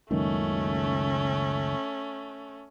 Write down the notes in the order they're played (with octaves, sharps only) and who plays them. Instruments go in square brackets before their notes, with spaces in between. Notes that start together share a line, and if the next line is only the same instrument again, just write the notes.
[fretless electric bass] F#1 C#2 D#3 [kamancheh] A3 C#4